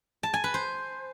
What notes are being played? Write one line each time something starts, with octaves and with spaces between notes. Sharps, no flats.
A5
G#5
B4
C5